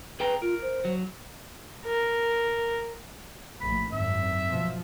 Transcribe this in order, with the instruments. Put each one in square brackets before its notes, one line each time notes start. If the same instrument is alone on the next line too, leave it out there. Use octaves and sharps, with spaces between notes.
[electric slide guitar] G#4 G5 A#5 [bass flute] B4
[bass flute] F4 [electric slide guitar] A#4
[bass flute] C5
[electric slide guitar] F#3
[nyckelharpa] A#4
[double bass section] A#1 A2 [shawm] B5
[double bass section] G#1 F#2 [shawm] E5
[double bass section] F#1 B2 F3